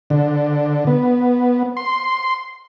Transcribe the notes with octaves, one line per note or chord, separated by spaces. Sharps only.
D3
B3
C6